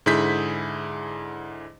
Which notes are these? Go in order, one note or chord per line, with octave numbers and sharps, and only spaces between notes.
G#2 D3 E4 G#4 G6 B6